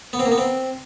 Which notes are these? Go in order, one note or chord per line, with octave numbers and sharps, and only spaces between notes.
B3
C4
A#3
B3
C4